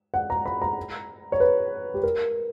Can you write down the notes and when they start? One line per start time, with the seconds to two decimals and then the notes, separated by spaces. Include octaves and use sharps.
0.14 F#5
0.30 A#5
0.46 B5
0.62 A#5
1.32 C#5
1.40 B4
1.94 G4
2.03 A#4